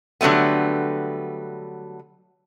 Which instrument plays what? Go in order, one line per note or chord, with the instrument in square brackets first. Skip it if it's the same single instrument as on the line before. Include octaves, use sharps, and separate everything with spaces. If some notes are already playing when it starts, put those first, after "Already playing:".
[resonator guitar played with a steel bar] D3 F#3 G3 A3 B3